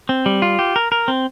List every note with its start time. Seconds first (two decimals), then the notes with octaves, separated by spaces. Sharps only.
0.09 C4
0.26 G3
0.42 F4
0.59 G4
0.76 A#4
0.92 A#4
1.08 C4